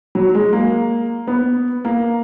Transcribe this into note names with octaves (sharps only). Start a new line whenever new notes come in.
F#3
G#3
A#3
B3
A#3